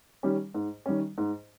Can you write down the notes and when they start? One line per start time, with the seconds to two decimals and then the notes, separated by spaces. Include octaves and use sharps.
0.23 D#3 G3 C#4
0.54 G#2
0.86 D#3 G3 C#4
1.18 G#2